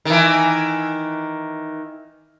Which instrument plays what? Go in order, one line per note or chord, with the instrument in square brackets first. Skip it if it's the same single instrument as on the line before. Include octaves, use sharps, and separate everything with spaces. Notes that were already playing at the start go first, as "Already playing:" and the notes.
[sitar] D#3 E3